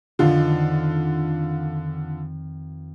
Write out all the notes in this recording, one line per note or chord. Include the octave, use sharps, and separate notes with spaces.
F2 D3 D#3 F4